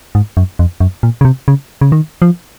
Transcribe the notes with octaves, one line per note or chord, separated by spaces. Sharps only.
G#2
F#2
F2
F#2
A#2
C#3
C3
C#3
C#3
D#3
F3